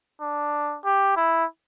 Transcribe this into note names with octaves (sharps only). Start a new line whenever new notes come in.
D4
G4
E4